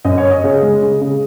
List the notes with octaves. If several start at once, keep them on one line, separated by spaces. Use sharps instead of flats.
F#2 D#5
C#5
C#4
D#5
C#3
G#3
C#3
C#3